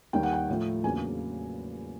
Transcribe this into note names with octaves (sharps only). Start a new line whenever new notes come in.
D#2 D#3 G3 G5
F#5
G5
A2 F3 A3
E2 C#3 F#3 A#3 D4 G#5